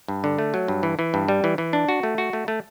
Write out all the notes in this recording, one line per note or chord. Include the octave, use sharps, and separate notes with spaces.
G2
D3
A3
F#3
G2
E3
E3
G2
G3
E3
E3
D4
F#4
A3
F#4
A3
A3